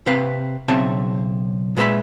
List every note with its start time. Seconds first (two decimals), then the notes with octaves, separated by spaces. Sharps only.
0.06 C3 C4 B4 F5
0.68 B1 C#3 C4 C#5 E5 A5
1.77 A#2 G#3 B4 C5 E5 B5